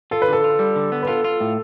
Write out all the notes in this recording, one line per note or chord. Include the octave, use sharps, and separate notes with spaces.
F4 A4
B4
D3 A4
F4
G3
D3
B3
B4
F4 A4
F4
A2